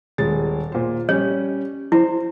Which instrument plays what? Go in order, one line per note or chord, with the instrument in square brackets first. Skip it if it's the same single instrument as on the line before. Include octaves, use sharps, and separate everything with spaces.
[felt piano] D#1 G#3 A6
A#2 C5
[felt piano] G3 C#4 [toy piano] C#5
[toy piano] E4 [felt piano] C5